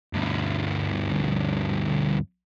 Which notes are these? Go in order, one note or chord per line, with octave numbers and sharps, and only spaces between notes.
D2 G2